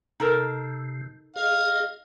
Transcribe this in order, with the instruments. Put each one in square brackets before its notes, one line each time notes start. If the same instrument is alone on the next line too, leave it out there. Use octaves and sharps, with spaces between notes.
[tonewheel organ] C3 [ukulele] D#4 A4 A#4
[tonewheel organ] G#4 D#5 [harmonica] F5